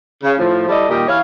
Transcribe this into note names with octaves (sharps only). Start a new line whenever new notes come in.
C#3
A2 F3
G3 E4 A4 D5 D#5
A#2 D#3 G3 G4 D#5
E3 E4 C#5 F5